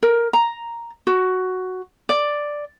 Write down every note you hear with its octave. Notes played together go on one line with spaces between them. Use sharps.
A#4
A#5
F#4
D5